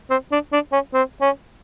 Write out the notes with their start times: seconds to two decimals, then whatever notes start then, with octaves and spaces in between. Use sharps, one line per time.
0.10 C4
0.32 D4
0.53 D4
0.73 C#4
0.94 C4
1.21 C#4